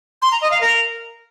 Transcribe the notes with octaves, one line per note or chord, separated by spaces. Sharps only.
C6
A#5
D#5
F5
A#4